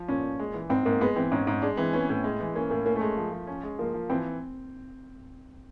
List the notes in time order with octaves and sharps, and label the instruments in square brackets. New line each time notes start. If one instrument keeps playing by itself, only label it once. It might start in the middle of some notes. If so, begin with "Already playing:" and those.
Already playing: [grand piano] F3
[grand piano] A#2 [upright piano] C#4
[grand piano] A#2
G#3
E3
[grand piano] G#2 [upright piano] C4
[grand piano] G#2 [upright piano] A#3
[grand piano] G#3 [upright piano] B3
[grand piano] E3 [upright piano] C4
[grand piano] G#2 [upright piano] C#4
[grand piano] G#2
[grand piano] G#3 [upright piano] D4
[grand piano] E3 [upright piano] C4
[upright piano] B3 [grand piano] C#4
[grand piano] A2
G#3
E3
[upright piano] A#3 [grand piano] C#4
[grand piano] A2 [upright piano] A#3
[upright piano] A#3 [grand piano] C#4
[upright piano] A3
[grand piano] G#3
F3
F3
C#4
G#3
[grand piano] F3 [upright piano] A#3
[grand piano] F3
[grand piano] E3 [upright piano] C4